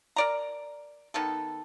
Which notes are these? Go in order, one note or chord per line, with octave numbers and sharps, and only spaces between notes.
A#4 D5 A#5
D#3 B3 A4